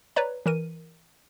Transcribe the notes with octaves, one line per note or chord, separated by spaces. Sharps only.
B4 C#5 D5 A#5
E3 A#4 D#7